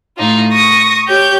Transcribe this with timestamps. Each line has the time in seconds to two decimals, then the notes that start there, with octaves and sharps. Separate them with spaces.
0.17 A2 D#4 F4
0.51 C#6 D#6 A#6
1.07 G4 C#5 G6